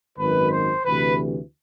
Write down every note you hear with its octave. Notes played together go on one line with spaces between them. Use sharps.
G#1 F#2 D#3 B4
C5
D2 C3 E3 B4